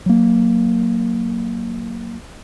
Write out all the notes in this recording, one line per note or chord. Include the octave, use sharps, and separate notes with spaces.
F#3 A#3